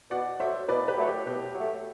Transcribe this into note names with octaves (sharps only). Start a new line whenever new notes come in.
B2 D5 F#5
F#3 A3 C5 E5
B2 B4 D5
G4 B4
F#3 A3
G4
B2 G4
F#3 A3